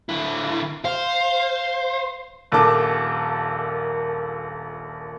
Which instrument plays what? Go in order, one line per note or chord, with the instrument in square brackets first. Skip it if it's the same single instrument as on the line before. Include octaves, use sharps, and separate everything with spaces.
[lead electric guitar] D3 E4
[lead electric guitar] C5 [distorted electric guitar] F5
[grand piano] D#1 A#1 A#3 A4 A5 D6